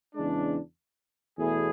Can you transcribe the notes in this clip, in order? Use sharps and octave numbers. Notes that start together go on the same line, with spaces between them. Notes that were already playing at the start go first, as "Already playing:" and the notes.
E2 C#3 G#3 D4
E2 B2 A3 E4 G#4